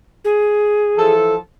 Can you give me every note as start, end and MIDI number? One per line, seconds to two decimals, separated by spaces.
0.25 1.13 68
0.97 1.36 52
0.97 1.36 53
0.97 1.36 69